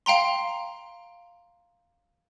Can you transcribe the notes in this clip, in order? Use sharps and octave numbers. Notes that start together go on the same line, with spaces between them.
F5 G5 A#5 C6